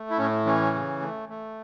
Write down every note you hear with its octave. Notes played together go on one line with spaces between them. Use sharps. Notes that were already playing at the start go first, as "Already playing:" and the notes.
Already playing: A3
E4
A2 C#4
E3 C#4
C#3
A3
A3